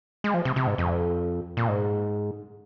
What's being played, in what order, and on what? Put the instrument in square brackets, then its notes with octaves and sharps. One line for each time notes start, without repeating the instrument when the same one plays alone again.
[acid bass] G#3
F3
C3
C3
G#2
F2
A#2
G#2